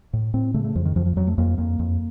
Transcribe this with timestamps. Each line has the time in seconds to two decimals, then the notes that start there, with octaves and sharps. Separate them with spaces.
0.13 A2
0.34 A2 C4
0.54 C#3 A3
0.64 A3
0.75 F2 F3
0.85 D#3
0.96 F2 F3
1.06 F3
1.16 F2 F#3
1.27 A3
1.38 F2 A#3
1.58 F2 A#3
1.79 F2